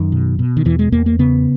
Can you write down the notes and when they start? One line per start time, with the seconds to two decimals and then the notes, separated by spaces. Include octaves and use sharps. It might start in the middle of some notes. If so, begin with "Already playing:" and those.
Already playing: F#2 D#3
0.12 B2
0.39 B2
0.57 D#3
0.65 E2 E3
0.79 G#3
0.92 E2 A#3
1.06 A#3
1.19 C#3 B3